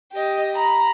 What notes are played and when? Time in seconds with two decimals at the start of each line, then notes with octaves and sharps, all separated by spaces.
0.12 G4 D#5
0.55 A#5 B5